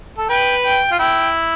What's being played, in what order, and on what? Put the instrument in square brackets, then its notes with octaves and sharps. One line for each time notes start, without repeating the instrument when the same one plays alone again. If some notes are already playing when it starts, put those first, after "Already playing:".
[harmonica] A4
[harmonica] B4 [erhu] G5
[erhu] G5
[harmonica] F4
[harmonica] E4 [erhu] G5